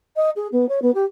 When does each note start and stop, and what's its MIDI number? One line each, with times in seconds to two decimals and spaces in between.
0.16 0.30 75
0.36 0.47 68
0.52 0.68 59
0.68 0.80 73
0.82 0.91 59
0.94 1.04 67